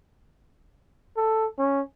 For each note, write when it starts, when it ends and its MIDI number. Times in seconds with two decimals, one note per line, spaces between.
1.17 1.46 69
1.58 1.81 61